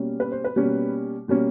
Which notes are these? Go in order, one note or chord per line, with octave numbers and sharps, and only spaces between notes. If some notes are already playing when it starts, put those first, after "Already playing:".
Already playing: B2 G3 A#3 C#4
B4
C5
B4
B2 G3 A#3 C#4
B2 G3 A#3 C#4